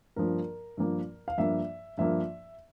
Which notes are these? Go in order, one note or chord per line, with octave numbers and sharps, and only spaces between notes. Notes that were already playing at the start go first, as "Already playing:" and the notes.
G2 F3 A#3 A#4
G2 F3 A#3
F5
G2 F3 A#3 E5
G2 F3 A#3 E5